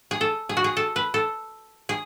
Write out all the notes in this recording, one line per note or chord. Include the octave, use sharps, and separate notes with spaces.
G#4
A4
G#4
F#4
G#4
A4
B4
A4
G#4